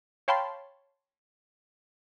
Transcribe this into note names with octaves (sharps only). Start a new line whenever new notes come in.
C#5 F5 G5 A5 B5 C6